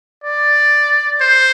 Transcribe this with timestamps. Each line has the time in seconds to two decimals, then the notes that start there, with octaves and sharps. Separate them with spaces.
0.24 D5
1.21 C5